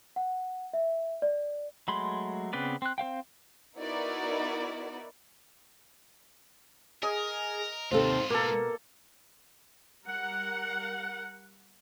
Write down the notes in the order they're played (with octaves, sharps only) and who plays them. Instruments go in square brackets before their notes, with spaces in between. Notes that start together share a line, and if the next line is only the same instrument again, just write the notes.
[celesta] F#5
E5
D5
[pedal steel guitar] F#3 G#3 A3 B5 C6
C#3 B3 C4 B4 D5
C4 F#6
C4 C5 F5 G5
[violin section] B3 D#4 E4 F#4 A#4 D5
[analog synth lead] G#4 [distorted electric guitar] A#4 [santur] D#5
[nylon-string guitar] D#2 C3 A4 [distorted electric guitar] G#2 F4 [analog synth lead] C5
[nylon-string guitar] B2 [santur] A#3 A4 [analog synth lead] A#4
[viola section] G3 A#4 F#5